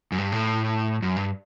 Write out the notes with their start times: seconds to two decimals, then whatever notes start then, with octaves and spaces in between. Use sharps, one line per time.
0.12 F#2
0.18 G2
0.32 A2
1.02 F#2
1.16 G2